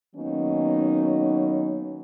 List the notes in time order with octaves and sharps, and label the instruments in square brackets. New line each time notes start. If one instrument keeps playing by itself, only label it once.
[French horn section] D#3 F#3 A#3 B3 C#4 D#4